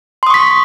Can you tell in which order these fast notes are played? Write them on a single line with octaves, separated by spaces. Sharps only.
C6 D#6 C#6 B6